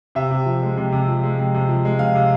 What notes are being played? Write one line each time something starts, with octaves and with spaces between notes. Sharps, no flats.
C3 E5
C3
F3
G#3
C3
C3
F3
G#3
C3
C3
F3
G#3
C3 F5
C3